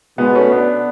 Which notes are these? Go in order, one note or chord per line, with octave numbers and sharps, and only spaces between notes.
B2 G#3 B3
A3 C#4
B3 D4